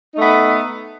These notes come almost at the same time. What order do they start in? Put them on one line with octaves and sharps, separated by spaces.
D#4 A3 B3